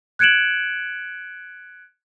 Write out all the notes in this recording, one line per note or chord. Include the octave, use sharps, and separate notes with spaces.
F#6 G#6 C#7 D7 E7 F#7